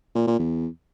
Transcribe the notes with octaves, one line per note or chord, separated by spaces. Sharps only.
A#2
A#2
E2